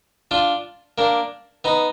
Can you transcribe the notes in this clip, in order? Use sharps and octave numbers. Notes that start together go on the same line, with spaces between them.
D4 F4
A#3 D4
B3 D#4